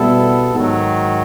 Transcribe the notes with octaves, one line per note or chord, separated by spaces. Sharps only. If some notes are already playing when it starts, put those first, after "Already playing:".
Already playing: B2 G3 B3 E4 A4
G#2 D#3 F#3